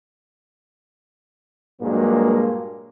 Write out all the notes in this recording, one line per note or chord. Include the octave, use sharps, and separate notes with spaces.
G2 A#2 F#3 G#3 A#3